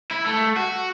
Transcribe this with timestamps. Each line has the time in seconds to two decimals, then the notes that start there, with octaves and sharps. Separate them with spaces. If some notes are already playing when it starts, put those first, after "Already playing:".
0.11 E4
0.25 A3
0.56 F#4